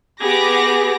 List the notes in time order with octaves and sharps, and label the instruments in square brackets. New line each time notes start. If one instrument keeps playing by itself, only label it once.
[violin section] B3 D6 A#6 [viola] G4 [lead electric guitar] G#4